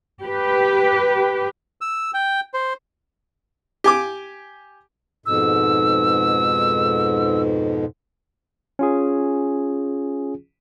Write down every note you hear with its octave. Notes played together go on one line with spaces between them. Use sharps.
G4 B4
E6
G5
C5
G4 G#5 D6
F2 G#2 B2 E6
C#4 F4 G#4